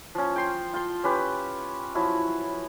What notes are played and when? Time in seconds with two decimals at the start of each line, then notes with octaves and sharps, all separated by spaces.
0.15 F3 C#4
0.36 G5 C6
0.73 F4 G5 C6
1.04 C#4 G4 B4 G5
1.95 F3 F#3 E4